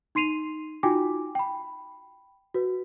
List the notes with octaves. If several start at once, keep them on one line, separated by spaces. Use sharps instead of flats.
D#4 C6 C7 D#7 F7
D#4 F4 F#4 G5 G#5 D6
G5 B5
F#4 B4